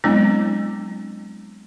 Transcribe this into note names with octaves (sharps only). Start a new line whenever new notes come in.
F#3 G#3 B3 C4 D4 E4